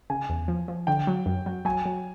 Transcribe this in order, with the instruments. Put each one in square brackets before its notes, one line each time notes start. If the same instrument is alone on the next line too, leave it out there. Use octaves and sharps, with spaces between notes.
[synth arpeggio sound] C#3 [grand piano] G#5
[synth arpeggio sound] E2
F3
F3
[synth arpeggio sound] D3 [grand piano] G5
[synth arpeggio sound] F#3
F#2
F#3
[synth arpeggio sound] F#3 [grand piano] G#5
[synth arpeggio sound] F#3